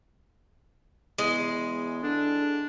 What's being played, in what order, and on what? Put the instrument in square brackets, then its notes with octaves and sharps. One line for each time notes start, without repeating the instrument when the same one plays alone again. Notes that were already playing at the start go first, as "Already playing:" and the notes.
[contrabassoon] E2 [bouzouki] G#3
[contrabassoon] D3 [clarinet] D4